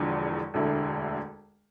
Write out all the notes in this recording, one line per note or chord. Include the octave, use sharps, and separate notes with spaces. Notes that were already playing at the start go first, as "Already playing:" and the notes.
Already playing: E1 E2 D3 F3
E1 D2 D3 A3 E4